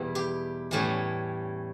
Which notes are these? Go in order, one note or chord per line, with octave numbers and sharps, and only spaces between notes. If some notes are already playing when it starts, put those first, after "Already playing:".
Already playing: E2 B2 G3 B3 E4
G4
A2 E3 G3 C#4